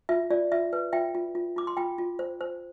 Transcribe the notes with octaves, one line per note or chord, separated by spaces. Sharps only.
F4 E5
F4 D5
F4 E5
B4
F4 E5 G5
F4
F4
F4 D6
C6
F4 G5 B5
F4
C5
C5